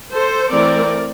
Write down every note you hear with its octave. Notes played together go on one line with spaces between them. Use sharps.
A4 C5
E3 A3 C4 A#4 D5